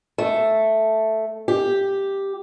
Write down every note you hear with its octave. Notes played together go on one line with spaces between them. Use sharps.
A3
G4